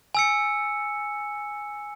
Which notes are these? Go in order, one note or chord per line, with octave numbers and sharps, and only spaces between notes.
G#5 E6 C#7